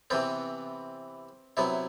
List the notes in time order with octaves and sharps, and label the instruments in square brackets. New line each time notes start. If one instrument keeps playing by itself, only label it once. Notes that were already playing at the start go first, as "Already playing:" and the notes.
[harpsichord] C3 E3 B3 C4
C3 F#3 B3 E4